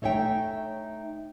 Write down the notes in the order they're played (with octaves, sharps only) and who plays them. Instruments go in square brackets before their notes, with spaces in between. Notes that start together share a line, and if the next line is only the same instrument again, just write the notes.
[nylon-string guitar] A3 D#4 C#5 E5 G5